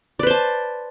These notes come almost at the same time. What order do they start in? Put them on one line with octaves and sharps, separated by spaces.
D5 B4 C5 A5